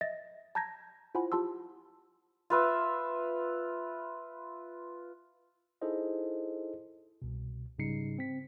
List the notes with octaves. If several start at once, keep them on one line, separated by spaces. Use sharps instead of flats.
D#5 E5 A6 A#6
A5 A#5 G6 G#6 A#6
E4 F4 C5 F#5 G#5 B5
F4 G4 A5 C6 E6
F4 B4 E5
D#4 E4 G#4 A4 C5 D#5
C2 B2
G#2 C#3 G3 D#4 C7 C#7
C4 B6